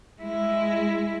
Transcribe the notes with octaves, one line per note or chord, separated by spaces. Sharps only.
G#3 E4